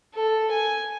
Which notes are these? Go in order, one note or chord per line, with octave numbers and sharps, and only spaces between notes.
A4
G#5